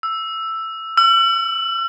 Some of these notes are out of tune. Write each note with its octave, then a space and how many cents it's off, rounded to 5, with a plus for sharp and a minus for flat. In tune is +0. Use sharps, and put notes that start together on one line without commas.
E6 +5
E6 +45